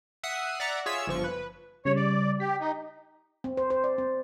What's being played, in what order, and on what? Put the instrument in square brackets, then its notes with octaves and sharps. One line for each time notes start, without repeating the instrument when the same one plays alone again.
[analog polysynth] E5 F#5 D#6 C7
D5 E5 F#5 A#5
F4 G#4 C#5 E5 E6
G1 F3 C#6
B4
[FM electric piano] C#3 G3 [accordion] C#5
[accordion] D5
[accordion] G4 [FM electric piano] B6
[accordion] D#4
[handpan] C4
C5
C5
D5
C4